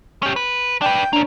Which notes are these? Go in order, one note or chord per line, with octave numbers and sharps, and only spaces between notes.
C#4 G4
B4
D4 B4 G5
A#3 C#4 D4